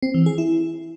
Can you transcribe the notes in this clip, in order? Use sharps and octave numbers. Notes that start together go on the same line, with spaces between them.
C4
E3
G#4
E4